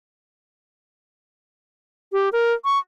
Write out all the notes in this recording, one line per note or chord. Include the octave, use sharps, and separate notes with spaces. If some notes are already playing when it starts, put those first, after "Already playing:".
G4
A#4
C#6